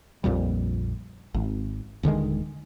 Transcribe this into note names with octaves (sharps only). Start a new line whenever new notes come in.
A#1 F2 A#2 G3
G#1
D#1 D3 D#3 G#3